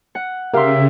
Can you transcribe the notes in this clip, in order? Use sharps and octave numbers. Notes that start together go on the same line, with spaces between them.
F#5
C#3 G4 A#4 E5 F5 C6